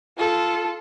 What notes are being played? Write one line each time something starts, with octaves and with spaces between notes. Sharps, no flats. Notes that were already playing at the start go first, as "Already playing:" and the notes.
F4 A4